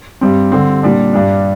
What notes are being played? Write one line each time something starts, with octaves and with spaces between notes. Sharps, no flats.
G2 G3 C4
D3 G3 C4
A#2 G3 D4
G2 G3 D4